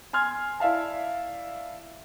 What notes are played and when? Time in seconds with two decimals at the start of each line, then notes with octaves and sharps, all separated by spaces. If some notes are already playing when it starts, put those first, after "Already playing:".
0.13 G#5 C6 F6 G#6
0.60 E4 D5 E5 F5 A5